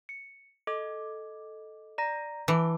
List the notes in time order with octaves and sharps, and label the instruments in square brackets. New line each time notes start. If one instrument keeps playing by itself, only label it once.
[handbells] C#7
A4 D#5 D6
D5 A#5 A#6
[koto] E3 [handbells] A5 D6